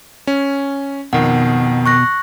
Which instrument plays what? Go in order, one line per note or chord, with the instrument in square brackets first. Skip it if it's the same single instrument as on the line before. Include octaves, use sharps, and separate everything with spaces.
[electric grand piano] C#4
[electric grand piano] F2 D#3 [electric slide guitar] B2 [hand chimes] F#5
[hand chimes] C#6 F#6 A#6